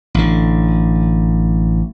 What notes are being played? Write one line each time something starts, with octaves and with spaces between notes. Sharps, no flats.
A1 D3